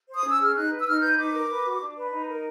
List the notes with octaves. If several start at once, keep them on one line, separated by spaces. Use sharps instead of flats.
C5
D#6
C#4 E6
G#4 F6
D#4 F#6
B4
E6
D#4 F6
B4 G6
D#4 D6
A#4
B4
F#4
D4
B4
D#4
A#4